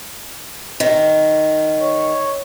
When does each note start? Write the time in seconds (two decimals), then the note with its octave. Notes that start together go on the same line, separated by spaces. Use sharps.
0.80 D#3
1.78 C#5